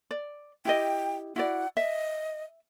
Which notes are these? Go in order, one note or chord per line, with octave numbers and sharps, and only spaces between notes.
D5
E4 G4 D#5 G5
E4 F#4 D5 F#5
D#5 E5